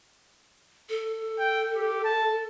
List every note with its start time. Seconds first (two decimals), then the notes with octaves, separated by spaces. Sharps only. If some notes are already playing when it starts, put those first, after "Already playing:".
0.89 A4
1.39 G5
1.75 G4
2.04 A5